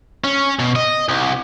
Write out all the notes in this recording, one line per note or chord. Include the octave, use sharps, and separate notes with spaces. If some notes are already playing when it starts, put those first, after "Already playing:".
C#4
B2
D#5
C2